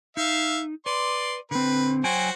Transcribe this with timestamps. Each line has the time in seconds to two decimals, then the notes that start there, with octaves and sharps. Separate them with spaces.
0.17 D#4 E5 F5
0.86 B4 D5 C6
1.51 D3 C4 B4
2.04 F#3 F#4 C5 G5 G#5